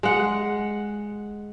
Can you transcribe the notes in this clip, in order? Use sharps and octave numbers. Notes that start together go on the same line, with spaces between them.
G#3 F#5